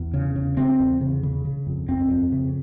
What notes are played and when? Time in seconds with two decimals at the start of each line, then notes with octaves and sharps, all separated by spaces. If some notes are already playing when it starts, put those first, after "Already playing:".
Already playing: E2
0.14 C#3
0.36 C#3
0.57 C#3 C4
0.80 E2
1.01 C#3
1.23 C#3
1.45 C#3
1.67 F2
1.89 F2 C4
2.10 F2
2.32 C#3